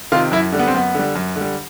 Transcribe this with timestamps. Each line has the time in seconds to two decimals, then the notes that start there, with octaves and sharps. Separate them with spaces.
0.12 C3 D#3 F4
0.32 F#2 E4
0.52 D3 G3
0.59 B3
0.67 C4
0.74 F#2 B3
0.95 D3 G3
1.15 F#2
1.36 D3
1.41 G3